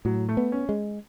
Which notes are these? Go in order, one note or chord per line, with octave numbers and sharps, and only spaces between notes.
A2 F#3
A3
B3
C#4
G#3